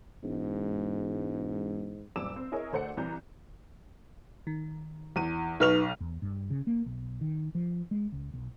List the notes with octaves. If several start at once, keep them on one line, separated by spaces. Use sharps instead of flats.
E1 G#2
F#1 A#2 G3 D6 E6 E7
C4
E4 G#4 A#4 C#5 D#5
D2 A3 C5 D5 F#5 C#7
C2 E3 D5 A#5 G6
D#3
E2 D#7
B1 D#4 B4 C#6 F6 F7
E2
G2
C#3
A#3
B1
D#3
F3
G#3
C#2
B1